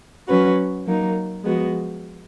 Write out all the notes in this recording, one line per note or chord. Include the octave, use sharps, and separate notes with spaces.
F#3 C#4 F#4 B4
F#3 A#3 D#4
F3 G#3 B3 F#4